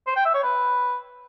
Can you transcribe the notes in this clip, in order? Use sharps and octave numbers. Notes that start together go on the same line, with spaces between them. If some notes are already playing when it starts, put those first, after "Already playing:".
C5
G5
E5
C#5
B4